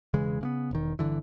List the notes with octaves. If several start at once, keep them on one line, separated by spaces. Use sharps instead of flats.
E1 C#3 E3 G#3
C#3 A#3 B3
E1 D#3
G1 C2 D3 E3